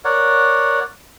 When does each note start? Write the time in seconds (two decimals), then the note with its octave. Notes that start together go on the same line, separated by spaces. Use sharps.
0.05 A#4 C#5 D5 F#5